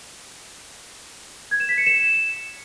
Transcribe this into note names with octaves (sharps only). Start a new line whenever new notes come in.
G#6
E7
B6
C#7
E7